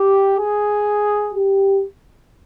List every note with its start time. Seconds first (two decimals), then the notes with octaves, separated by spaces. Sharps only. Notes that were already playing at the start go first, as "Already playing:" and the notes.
Already playing: G4
0.38 G#4
1.33 G4